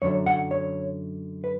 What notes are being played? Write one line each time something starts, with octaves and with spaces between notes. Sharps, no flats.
F#2 D3 F#3 C#5
F#5
C#5
B4